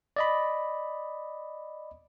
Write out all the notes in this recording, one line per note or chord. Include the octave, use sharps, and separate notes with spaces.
D5 D#5 B5